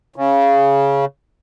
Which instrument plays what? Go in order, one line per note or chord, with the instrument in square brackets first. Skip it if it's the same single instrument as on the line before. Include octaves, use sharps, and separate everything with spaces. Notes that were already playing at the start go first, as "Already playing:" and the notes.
[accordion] C#3